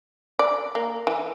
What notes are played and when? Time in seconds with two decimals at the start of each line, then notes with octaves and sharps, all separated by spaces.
0.39 D5
0.75 A#3
1.07 E3